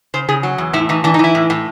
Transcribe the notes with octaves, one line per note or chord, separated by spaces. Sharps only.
C#3 C5
C#3 G#4
F#3
E2
A2 E4
E3 D#4
E3 D4
D#4
E3 E4
A2
A2